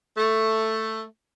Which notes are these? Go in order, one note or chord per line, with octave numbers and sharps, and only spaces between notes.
A3